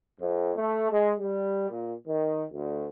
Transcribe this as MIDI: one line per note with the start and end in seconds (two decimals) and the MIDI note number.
0.20 0.52 41
0.56 0.89 57
0.91 1.13 56
1.19 1.69 55
1.69 1.94 46
2.06 2.44 51
2.51 2.87 38